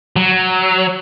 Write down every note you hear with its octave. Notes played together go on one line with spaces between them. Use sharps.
F#3